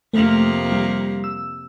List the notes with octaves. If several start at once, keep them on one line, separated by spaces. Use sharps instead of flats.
F2 C3 A3 A#3
G3
E6